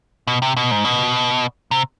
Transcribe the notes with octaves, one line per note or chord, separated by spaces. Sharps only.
B2
C3
B2
G#2
B2
C3